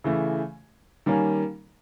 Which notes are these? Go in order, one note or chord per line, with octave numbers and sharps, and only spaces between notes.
C#3 E3 A3
D#3 G3 A#3 C#4